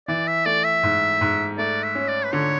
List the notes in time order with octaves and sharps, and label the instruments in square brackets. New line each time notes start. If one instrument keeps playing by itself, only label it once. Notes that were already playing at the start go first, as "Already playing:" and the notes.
[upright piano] E3 [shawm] D5
[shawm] E5
[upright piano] A3 [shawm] D5
[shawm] E5
[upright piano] G#2
G#2
[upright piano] A3 [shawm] D5
[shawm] E5
[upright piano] C#4
[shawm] D5
B4
[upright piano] D3 [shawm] C#5